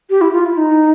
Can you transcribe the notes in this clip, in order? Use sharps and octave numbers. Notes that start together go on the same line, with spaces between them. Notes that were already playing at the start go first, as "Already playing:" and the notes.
G4
E4
F4
E4
D#4